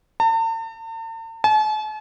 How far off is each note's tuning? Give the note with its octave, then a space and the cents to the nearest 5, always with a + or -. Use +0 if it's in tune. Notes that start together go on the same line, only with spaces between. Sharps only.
A5 +45
A5 -45